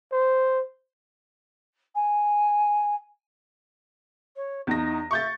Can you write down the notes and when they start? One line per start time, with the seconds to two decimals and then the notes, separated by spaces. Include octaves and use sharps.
0.12 C5
1.95 G#5
4.36 C#5
4.67 E2 D#4 A#6
5.11 E5 C#6 G6 A6